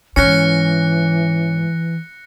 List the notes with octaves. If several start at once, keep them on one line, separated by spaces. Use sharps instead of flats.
G#2 E3 C#4 F#6 A#6 C#7